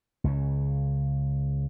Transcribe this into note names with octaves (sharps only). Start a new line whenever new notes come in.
C#2 C#3